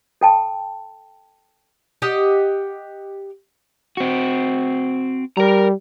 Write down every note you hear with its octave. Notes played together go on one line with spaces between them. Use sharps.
A4 G5 A5
G4 D#5 F#5
C4 F#4
G3 A#4 A#5